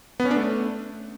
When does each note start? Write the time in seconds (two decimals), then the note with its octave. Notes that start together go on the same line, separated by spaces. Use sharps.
0.20 B3
0.25 C#4
0.31 D4
0.36 A3